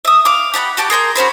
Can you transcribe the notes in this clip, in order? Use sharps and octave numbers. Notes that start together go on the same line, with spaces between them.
E5 D#6
F5 D6
G4 F#5 A5 B5
F#4 G4 A5 D6
G#4 A#4 C6 G6
C#4 F#4 C5 B5